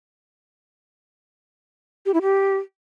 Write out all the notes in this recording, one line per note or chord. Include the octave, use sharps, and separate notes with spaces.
G4
E4
G4